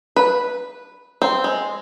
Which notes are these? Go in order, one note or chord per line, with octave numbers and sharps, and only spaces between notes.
B4
C4
G#3